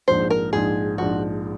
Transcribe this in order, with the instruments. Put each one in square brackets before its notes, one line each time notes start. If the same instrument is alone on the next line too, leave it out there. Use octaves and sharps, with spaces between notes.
[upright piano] A#1 G#2 F3 [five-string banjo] C5
[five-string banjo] A#4
[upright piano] A#1 G#2 F3 [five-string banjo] G#4
[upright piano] A#1 G#2 F3 [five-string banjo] F#4